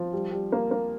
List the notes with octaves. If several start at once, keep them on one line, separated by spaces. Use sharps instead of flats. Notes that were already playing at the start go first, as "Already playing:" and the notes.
Already playing: F3
G3
G3
A#3
A#3